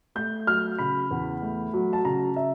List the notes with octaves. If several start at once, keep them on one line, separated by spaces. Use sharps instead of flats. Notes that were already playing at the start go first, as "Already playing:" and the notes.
A3 G6
F#3 F6
C#3 B5
E2
A3
F#3
A5
C#3 A#5
E5